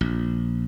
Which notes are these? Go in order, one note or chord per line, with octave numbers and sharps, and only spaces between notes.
A#1